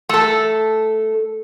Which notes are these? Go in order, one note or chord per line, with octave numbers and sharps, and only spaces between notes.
A3 A4